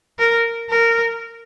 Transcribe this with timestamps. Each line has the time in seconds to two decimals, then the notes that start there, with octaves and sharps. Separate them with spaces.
0.19 A#4
0.69 A#4